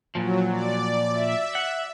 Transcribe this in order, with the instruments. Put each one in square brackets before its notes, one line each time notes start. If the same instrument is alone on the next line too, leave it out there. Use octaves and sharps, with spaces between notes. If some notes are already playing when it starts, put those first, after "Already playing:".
[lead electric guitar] A#2 F3 [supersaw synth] F#3
[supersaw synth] D5
E5
[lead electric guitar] F#5